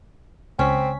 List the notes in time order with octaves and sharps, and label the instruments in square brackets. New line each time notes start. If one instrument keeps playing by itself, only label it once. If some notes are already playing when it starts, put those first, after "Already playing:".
[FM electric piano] C#2 B6 [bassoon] C4 [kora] C#4